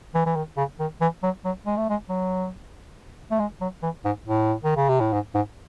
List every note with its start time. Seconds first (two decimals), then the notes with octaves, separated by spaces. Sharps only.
0.15 E3
0.26 E3
0.36 D#3
0.57 C#3
0.80 D#3
1.01 E3
1.23 F#3
1.45 F#3
1.66 G#3
1.77 A3
1.90 G#3
2.09 F#3
3.31 A3
3.40 G#3
3.61 F#3
3.83 E3
4.05 G#2
4.27 A2
4.64 D#3
4.76 C#3
4.89 C3
5.00 A2
5.13 G#2
5.35 G#2